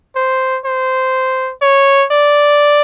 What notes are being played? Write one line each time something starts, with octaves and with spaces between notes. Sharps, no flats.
C5
C5
C#5
D5